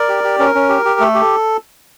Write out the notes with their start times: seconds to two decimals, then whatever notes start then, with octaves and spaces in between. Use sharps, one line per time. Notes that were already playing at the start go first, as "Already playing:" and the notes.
Already playing: A#4 D5
0.09 G4
0.24 G4
0.39 C#4 A#4
0.55 C#4
0.69 G4
0.85 G4
1.00 A3 A4
1.14 G4